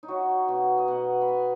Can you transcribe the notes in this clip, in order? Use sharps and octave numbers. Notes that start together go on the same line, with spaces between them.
D#4
F#3 F#4
B2 F#4
D#5
B2 F#5
B5
B2 G#5